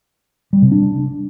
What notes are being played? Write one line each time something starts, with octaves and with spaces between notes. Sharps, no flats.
G3
C3
D4